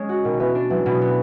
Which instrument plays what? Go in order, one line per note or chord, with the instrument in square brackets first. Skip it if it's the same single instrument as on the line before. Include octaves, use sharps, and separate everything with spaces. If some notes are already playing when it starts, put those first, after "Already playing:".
Already playing: [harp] G#3 C#4
F#4
[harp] B2 [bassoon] D#3
[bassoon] E3 [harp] B3
[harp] D4
[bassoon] E3 [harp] F#3
[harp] B2
B3